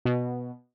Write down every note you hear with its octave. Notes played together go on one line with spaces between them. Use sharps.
B2